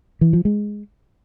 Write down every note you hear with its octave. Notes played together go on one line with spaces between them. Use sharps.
E3
F3
G#3